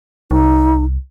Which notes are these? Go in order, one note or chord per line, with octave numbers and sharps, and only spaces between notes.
C2 D#4